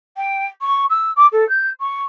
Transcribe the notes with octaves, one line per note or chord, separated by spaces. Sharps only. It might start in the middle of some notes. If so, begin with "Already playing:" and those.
G5
C#6
E6
D6
A4
G6
C#6